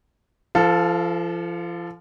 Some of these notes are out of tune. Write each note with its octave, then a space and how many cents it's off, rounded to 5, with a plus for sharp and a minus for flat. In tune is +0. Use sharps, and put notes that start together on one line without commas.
F3 -35 A4 +0 F5 +10